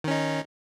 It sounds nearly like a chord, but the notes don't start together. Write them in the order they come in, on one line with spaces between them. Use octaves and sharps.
D#3 C#4 D#4